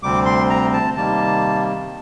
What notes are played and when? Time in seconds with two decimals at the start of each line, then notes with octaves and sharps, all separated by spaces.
0.02 D2 C3 G3 C4 D6
0.26 C6
0.50 A#5
0.73 A5
0.97 C3 D#3 G3 A#3 A5